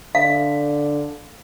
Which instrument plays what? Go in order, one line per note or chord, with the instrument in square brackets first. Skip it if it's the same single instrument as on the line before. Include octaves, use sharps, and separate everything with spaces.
[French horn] D3 [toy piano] F5